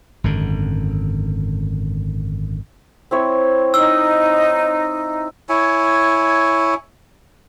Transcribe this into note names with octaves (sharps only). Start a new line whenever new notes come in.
G#1 F#2 D3
C4 E4 C#5
D#4 E6
E4 C#5 G#5